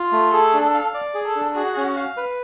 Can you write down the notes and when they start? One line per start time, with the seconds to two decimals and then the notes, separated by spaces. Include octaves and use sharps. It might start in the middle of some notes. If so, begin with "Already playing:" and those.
Already playing: F4
0.12 A3
0.33 G#4 A4
0.54 D4
0.74 F5
0.94 D5
1.14 G#4
1.26 A4
1.36 D4
1.55 F#4 G#4
1.77 C#4
1.97 F5
2.17 B4